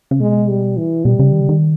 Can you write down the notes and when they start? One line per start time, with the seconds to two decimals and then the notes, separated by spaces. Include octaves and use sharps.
0.11 C#3
0.20 B2 G#3
0.49 G3
0.77 E3
1.05 B2 G3
1.19 C#3
1.32 D#3
1.40 C#3
1.49 D#3